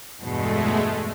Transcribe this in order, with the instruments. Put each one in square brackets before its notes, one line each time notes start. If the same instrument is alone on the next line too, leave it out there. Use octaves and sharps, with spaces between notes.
[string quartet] E2 G2 B2 [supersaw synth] G#3 A3